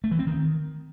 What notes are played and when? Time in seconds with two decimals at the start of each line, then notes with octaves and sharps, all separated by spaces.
0.04 A3
0.11 E3
0.19 C4
0.27 D#3